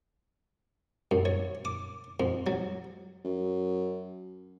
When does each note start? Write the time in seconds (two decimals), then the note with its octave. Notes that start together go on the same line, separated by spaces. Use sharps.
1.11 F#2
1.25 C#5
1.65 D6
2.20 F2
2.47 F#3
3.24 F#2